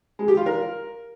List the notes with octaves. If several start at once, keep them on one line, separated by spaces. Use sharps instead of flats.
G#3
G4
F4
A#4